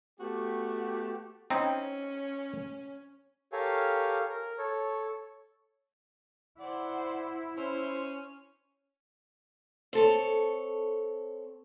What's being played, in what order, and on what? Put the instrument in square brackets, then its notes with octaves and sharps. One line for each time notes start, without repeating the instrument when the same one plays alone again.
[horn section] A3 B3 F#4 G4
[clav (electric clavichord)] C4 D#4 E4 [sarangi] C#4
[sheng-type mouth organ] G4 A4 A#4 C#5 F5 G#5
A#4
A4 C#5
[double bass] E4 [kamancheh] C5 F#5 [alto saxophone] D5
[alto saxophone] C#4 [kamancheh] C5
[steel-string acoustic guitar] C4 A4 C#5